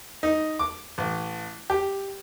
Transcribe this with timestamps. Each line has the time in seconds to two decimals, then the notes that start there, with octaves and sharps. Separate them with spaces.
0.23 D#4
0.59 D6
0.98 A1
1.70 G4